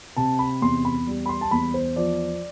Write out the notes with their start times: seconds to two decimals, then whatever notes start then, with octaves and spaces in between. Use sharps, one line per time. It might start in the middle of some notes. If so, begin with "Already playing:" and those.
0.17 C3 A5
0.39 B5
0.62 E2 C6
0.85 B5
1.07 G3
1.26 B5
1.29 C6
1.41 A5
1.51 E2 B5
1.74 C5
1.96 F3 D5